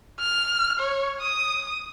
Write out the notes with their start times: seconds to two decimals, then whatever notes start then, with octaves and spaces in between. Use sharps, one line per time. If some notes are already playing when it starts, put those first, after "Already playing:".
0.20 F6
0.79 C#5
1.21 D#6